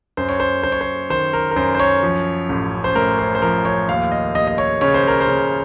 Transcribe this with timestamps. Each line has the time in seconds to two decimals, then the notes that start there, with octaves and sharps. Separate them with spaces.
0.17 F#2 C5
0.29 C#5
0.40 C5
0.63 F#2 C5
0.72 C#5
0.81 C5
1.10 D#3 C5
1.33 A#4
1.51 A#4
1.56 F#2 C5
1.75 C5
1.80 C#5
2.03 F3
2.49 A1
2.84 C5
2.95 A2 A#4
3.19 C5
3.35 C5
3.42 F3 A#4
3.65 C#5
3.88 D#2 F5
4.11 D#5
4.35 D#2 D#5
4.47 D#5
4.58 C#5
4.81 C#3 C#5
4.94 C5
5.08 A#4
5.21 C5
5.28 C#3